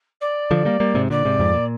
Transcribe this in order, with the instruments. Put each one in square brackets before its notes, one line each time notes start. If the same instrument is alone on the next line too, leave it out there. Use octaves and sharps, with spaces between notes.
[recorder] D5
[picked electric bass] D3 F3
G3 A#3
G3 A#3
G#2 C3
[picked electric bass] A#2 D3 [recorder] D5
[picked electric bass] G#2 C3
F2 G#2
A#2